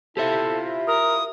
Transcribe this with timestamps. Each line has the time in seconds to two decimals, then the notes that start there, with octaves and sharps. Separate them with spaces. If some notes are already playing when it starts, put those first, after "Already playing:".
0.17 E4 F4 G4 A4 C5 E5
0.87 A#4 D#6